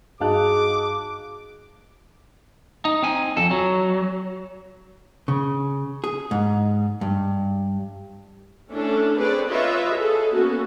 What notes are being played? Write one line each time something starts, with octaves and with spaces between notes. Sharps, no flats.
G2 D#4 F#4 G#4 F5 A5 D6 F#6
D#4
C4 G#5
F2 A4
F#3
C#3
G#4
G#2
G2
A3 C#4 D4 E4 A4
C4 G#4 B4 C#5 D5
F4 B4 C#5 D#5 E5
G#4 A4
A#3 B3 C#4 F#4 A4